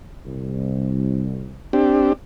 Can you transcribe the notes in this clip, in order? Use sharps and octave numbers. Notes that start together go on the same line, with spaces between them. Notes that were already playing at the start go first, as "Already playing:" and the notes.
C2
C4 D4 G4